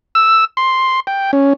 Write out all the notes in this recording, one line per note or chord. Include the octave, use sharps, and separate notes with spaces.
E6
C6
G5
C#4